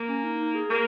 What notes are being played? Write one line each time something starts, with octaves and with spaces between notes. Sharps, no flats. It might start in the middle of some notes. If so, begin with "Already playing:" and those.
Already playing: A#3
C#4
D#4
D#4
G#4
A#3 A#4